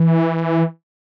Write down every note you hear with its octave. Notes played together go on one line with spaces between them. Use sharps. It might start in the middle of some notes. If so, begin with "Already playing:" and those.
Already playing: E3